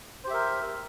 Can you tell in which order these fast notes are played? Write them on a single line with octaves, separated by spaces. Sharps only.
C5 G4 E5 A#4